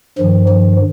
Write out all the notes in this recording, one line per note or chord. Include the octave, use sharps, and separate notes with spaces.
G2 D#3 F3
F3